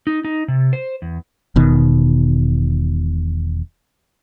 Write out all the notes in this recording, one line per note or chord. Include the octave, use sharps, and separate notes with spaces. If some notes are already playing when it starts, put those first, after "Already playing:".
D#4
D#4
C3
C5
E2
E1 B2 D#3